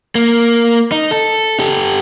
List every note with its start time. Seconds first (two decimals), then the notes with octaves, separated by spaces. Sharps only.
0.15 A#3
0.92 D#4
1.11 A4
1.59 G4 A4